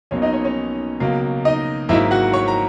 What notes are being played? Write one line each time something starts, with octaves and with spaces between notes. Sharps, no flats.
B1 B2 A#3 C#4 C#5
D#4 D#5
C#4 C#5
C#4 C#5
C#2 B2 F#3 A#3
D#4 D#5
G#1 G#2 F#3 A#3 E4 E5
F#4 F#5
C#5 C#6
A#5